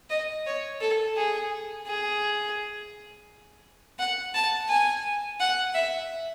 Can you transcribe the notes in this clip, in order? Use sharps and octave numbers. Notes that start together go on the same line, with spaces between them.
D#5
C#5
A4
G#4
G#4
F#5
A5
G#5
F#5
E5